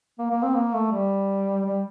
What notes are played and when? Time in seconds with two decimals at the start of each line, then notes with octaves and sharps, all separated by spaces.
0.19 A#3
0.30 A#3
0.43 C4
0.55 A#3
0.73 A3
0.91 G3
1.65 G3